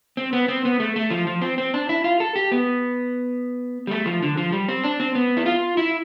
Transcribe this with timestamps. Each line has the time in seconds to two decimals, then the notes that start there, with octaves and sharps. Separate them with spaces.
0.17 C4
0.33 B3
0.48 C4
0.65 B3
0.80 A3
0.96 A3
1.10 F3
1.27 F3
1.42 C4
1.58 C4
1.74 D4
1.89 E4
2.04 F4
2.20 A4
2.36 G4
2.52 B3
3.87 G3
3.91 A3
4.06 F3
4.23 D3
4.37 F3
4.52 G3
4.69 C4
4.84 D4
5.00 C4
5.15 B3
5.37 E4
5.46 F4
5.77 E4